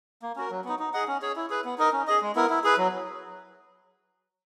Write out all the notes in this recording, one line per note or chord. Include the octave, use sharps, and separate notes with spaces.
A#3
C#4 F#4 A#4
F#3
B3 D#4
D#4
G#4 D#5 F#5
C#4
G#4 C#5
E4
G#4 B4
B3
D#4 A#4 D#5
C#4
G#4 D#5
G#3
B3 E4 A#4
E4
G#4 B4
F#3